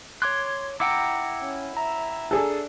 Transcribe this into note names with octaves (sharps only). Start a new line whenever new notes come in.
C#5 C6 D6 F#6 G#6
E4 F#5 G5 A#5 D6 E6 C#7
C#4
E5 A#5
D4 G#4 A4